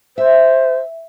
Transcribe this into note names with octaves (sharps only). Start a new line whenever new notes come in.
C5 E5